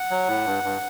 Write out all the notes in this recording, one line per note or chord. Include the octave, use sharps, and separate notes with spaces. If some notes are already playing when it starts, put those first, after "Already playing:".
Already playing: F#5
F#3
A2
G2
G2